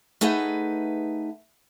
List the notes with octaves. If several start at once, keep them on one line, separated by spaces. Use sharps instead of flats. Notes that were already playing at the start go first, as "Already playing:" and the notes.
A3 D#4 G#4 B4 F#5